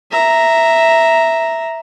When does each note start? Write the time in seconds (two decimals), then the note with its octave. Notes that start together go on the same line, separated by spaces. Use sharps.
0.12 E5 A#5